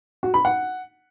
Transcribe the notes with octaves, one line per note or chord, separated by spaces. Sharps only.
F#4
B5
F#5